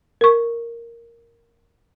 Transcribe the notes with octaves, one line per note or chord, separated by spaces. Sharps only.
A#4 C#6